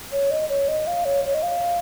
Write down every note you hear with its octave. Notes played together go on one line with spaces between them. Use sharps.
C#5
D#5
C#5
D#5
F5
C#5
C#5
D#5
F5